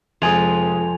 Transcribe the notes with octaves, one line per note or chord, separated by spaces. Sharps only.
F1 F2 G#3 G#5 D#6 F7